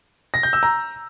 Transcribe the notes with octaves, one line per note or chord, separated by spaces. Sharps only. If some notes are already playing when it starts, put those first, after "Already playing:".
A#6
G6
E6
A#5